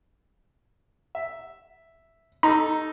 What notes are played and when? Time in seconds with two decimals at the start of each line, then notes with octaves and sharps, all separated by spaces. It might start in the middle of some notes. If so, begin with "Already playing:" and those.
1.15 E5
2.43 D#4 A4 A#5